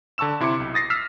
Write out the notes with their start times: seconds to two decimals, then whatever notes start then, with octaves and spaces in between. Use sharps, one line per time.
0.18 D3 A5 C#6 E6 E7
0.40 C3 E4 C6 D6 C#7
0.60 B1
0.74 D#6 A6 A#6 C7
0.90 E6 F6 B6 C7 E7